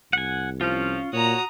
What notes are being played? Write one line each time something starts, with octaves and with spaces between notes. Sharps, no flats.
C2 F#5 G#5
F3 C#4 F4
A#2 F#4 C#5 A#5 D#6